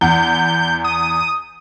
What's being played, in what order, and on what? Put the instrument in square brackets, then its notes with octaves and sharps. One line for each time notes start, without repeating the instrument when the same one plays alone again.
[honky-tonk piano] E2 F#5 [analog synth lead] G6
[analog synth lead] D#6